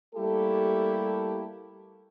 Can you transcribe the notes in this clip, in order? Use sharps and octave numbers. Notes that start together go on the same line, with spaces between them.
G3 A3 A#3 E4 G4 A4